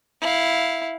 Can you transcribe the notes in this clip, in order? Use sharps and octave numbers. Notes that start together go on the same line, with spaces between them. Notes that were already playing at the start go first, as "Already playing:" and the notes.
E4 F5